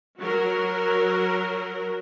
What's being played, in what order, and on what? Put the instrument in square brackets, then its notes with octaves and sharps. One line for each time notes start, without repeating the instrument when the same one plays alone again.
[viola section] F#3 F#4 A#4